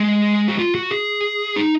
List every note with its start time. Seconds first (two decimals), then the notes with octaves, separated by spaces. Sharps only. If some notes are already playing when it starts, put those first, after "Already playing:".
Already playing: G#3
0.48 F#4
0.58 F4
0.75 F#4
0.91 G#4
1.56 D#4